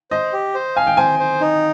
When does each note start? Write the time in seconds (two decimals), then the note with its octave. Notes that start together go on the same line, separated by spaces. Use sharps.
0.11 C5 D#5
0.33 G4
0.55 C5
0.76 F5 G#5
0.87 G5
0.97 C5 G#5
1.19 C5
1.41 D#4